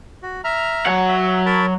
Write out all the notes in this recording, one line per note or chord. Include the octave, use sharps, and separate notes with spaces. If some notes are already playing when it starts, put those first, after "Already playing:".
F#4
E5 A#5 F6
F#3 F#5
E5
A#4 A5 B5